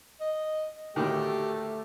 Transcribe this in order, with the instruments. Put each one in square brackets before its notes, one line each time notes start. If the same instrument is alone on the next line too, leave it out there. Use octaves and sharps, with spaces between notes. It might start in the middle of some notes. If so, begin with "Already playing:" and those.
[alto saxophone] D#5
[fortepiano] D2 A2 D#3 [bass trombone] A3 [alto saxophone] G4